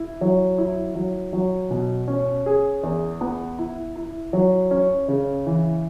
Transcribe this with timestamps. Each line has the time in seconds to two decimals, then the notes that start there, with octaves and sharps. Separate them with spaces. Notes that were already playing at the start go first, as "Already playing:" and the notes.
Already playing: E4
0.21 F#3
0.58 E4
0.95 F#3
1.33 F#3
1.70 B2
2.08 C#4
2.46 G#4
2.83 E2
3.21 B3
3.59 E4
3.96 E4
4.33 F#3
4.71 C#4
5.08 C#3
5.46 E3